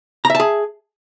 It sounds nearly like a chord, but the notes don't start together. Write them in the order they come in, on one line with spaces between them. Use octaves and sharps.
A#5 E5 A5 G#4